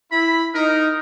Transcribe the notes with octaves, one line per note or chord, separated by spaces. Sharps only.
E4 B5
D#4 A#4